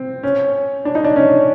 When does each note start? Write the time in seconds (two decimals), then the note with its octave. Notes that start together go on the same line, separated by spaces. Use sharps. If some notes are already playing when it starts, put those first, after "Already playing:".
Already playing: C4
0.23 C#4
0.85 D4
0.95 D#4
1.04 D4
1.16 C#4